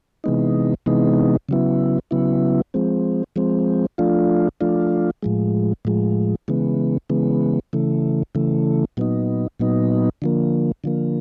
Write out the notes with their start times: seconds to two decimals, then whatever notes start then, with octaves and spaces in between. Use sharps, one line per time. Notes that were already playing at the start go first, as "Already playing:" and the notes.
0.24 C3 E3 G#3 B3 D#4
0.86 C3 E3 G#3 B3 D#4
1.49 C#3 F#3 B3 E4
2.11 C#3 F#3 B3 E4
2.74 F3 G#3 C4
3.36 F3 G#3 C4
3.98 F3 A3 D4 F4
4.61 F3 A3 D4 F4
5.23 A2 F3 G#3
5.85 A2 F3 G#3
6.48 C#3 E3 G#3 B3
7.10 C#3 E3 G#3 B3
7.73 C#3 E3 A3
8.35 C#3 E3 A3
8.97 A#2 F#3 B3 D#4
9.60 A#2 F#3 B3 D#4
10.22 D3 F3 A#3
10.84 D3 F3 A#3